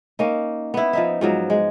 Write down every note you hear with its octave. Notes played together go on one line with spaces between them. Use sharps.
A#3 C#4 D#4
B3 E4
F3 D#4 E5
G#2 F3 F#3
G#3